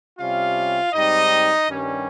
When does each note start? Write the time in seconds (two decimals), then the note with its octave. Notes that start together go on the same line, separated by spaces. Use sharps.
0.19 C3 G3 C#4 F4 F5
0.93 G#2 G3 C4 D#4 D#5
1.67 G2 D#3 G3 C#4